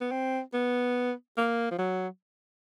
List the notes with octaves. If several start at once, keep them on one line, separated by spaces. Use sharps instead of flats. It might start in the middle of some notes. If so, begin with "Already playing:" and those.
B3
C4
B3
A#3
F3
F#3